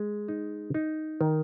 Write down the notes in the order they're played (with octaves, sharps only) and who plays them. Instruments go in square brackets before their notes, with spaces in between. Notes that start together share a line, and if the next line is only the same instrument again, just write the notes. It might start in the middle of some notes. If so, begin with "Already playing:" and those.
Already playing: [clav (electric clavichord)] G#3
D#4
D#4
D#3